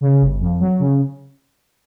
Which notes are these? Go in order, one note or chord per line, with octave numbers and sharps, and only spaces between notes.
C#3
G1
F2
F#3
C#3